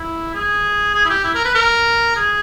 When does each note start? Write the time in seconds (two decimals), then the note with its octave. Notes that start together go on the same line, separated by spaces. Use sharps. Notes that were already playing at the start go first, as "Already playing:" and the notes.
Already playing: E4
0.34 G#4
0.94 G#4
1.05 E4
1.09 G4
1.24 E4
1.35 A#4
1.45 B4
1.55 A#4
2.16 G#4